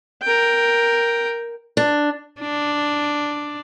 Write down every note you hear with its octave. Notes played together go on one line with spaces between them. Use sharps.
A#4 G5
D4
D4